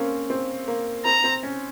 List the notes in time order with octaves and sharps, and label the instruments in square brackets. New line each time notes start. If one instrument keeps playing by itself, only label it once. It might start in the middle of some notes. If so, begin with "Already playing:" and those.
Already playing: [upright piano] A#3 C4 C#4
C4
A#3
[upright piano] C4 [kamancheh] A#5
[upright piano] C4
C#4